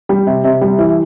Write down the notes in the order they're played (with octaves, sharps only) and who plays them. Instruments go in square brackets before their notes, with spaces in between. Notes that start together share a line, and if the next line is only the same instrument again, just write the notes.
[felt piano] G3
C3
C3
G3
E3